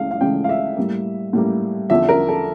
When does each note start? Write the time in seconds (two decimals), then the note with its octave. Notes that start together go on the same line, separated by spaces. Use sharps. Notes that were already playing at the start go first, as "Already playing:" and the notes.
Already playing: C#2 C#3 E3 A3 F5
0.11 F5
0.21 C#2 C#3 E3 A3 G5
0.44 F5
0.49 E5
0.77 A2 G3 A#3
1.33 A2 G3 A#3
1.90 E2 D3 F3 E5
2.09 A#4
2.29 A4